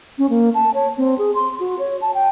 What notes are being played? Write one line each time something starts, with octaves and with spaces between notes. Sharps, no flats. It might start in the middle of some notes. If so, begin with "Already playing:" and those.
C#4
A#3
A5
C#5
C4
G#4
C6
F#4
C#5
A5
G5